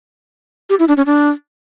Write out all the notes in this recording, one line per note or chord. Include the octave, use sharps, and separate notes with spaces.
G4
E4
D4
C#4
D4